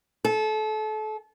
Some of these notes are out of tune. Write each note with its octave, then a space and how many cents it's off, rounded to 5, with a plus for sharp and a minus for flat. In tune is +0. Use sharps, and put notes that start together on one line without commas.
A4 -30